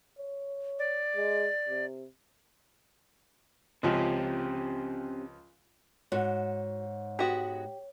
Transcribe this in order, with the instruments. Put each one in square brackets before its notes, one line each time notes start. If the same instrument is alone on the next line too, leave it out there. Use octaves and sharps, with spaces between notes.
[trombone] C#5
[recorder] D5
[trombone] G#3
C3
[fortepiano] C#2 F3 [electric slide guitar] C4 C#4 G4
[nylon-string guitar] G#2 [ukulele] F#4 [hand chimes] C#5
[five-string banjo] G#3 B3 F#4 [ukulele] G4